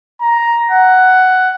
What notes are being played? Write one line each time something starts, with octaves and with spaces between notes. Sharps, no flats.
A#5
F#5